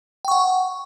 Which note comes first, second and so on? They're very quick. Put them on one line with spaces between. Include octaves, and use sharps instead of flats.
G5 C#6 F#5